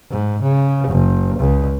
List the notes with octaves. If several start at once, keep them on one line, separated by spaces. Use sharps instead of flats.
G#2
C#3
F#1
C#2